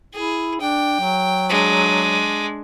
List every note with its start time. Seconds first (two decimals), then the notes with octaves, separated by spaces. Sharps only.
0.14 E4 G#4
0.60 D4 G5
1.00 F#3
1.50 G#3 D4